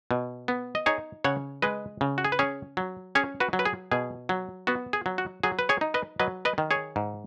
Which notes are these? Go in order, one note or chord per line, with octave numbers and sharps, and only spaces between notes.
B2
B3
D#5
D#4 G#4 C#5
C#3 C#5 F#5
G#3 B4 D#5
C#3
F#4
G#4
B4
C#4 G#4 C#5
F#3
C#4 G#4 C#5
F#4 B4
F#3
B4
G#4
B2 G#4
F#3
B3 F#4
G#4
F#3
F#4
F#3 G#4
B4
G#4 C#5
D#4
B4 D#5
F#3 B4 D#5
B4 D#5
D#3
G#4 C#5
G#2